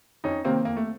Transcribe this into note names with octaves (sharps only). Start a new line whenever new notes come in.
F2 C#4 D#4
C3 D#3 A#3 C4
F2 A#3
A3